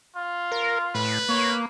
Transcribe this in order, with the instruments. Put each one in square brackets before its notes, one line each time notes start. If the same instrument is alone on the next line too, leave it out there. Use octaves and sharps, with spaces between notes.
[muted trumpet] F4
[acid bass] A#4
[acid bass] A2 [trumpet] B4
[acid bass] A#3 [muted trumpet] C#5